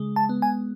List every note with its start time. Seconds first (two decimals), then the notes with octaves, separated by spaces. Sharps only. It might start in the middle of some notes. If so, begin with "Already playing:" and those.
Already playing: C#3 G#3
0.16 A5
0.29 B3
0.42 G#5